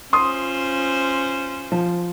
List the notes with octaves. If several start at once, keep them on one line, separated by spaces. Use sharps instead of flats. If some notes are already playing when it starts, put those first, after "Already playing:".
C#4 F4 C5 C6 D#6
F3